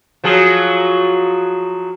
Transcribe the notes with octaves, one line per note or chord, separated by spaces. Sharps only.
F3 F#3 G#4